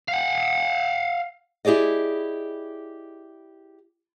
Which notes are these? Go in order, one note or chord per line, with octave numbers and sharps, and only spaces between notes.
F5 F#5
E4 G4 G#4 D5 D#5